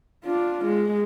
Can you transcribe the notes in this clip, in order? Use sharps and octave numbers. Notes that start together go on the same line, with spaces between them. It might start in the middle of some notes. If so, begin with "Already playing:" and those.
D4 F4
G#3